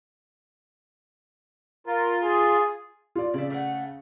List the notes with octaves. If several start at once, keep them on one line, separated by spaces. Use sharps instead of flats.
F4 A#4
G#4
F4 D5
C#3 D5 E5
A3 F5 F#5